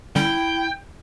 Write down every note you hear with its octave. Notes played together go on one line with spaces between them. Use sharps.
D3 G3 C#4 E4 G5